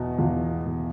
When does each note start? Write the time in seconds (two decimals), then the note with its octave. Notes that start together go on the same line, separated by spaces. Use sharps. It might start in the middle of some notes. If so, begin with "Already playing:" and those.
Already playing: E2 B2
0.19 E2 F4
0.66 B2